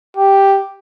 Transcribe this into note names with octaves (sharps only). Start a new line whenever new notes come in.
G4